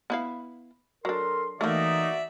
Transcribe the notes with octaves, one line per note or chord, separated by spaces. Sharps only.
B3 E4 F5
F#3 D4 A4 A#4 C6
E3 A3 A#3 D#4 F#4 D5 E5